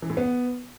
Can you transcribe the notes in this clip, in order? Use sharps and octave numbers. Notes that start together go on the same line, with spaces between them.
E3
A2
B3